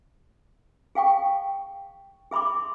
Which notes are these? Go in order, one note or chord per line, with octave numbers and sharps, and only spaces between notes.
G#4 F5 G5 C#6
G#4 E5 B5 C6 D6